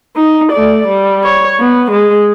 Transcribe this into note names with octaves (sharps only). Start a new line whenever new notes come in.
D#4
A3 D5
G3
C#5
B3
G#3